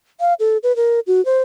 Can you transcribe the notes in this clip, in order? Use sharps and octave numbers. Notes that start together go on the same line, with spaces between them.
F5
A4
B4
A#4
F#4
C5